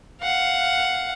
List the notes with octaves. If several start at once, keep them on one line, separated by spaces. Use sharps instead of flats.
F5 F#5